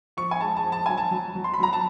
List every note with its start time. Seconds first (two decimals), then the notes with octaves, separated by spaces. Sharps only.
0.17 F3 C#6
0.31 G#5
0.40 G#3 A5
0.57 A5
0.64 F3
0.72 A5
0.86 F#3 G#5
0.98 A5
1.11 F#3
1.35 F#3
1.44 C6
1.54 B5
1.60 F#3 A#5
1.73 A5